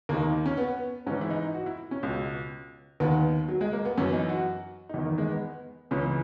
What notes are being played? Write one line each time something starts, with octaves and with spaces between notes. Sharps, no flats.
D#2 D#3 A#3
C#4
B3
G#2 E3 C#4
E4
D#4
F#4
E4
C#4
C#2 B2
D#2 D#3 B3
F#3
G#3
A#3
B3
F#2 E3 C#4
D#4
F#4
D#4
E2 D#3 E4
A#3
G#3
B3
C#2 C#3 E3 C#4